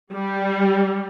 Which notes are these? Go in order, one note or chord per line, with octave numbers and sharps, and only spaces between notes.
G3